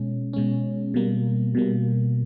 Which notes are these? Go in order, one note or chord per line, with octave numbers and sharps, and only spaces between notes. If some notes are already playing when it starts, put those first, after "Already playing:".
Already playing: B2 G#3 C#4
B2 G#3 C#4
B2 G3 A#3
B2 G3 A#3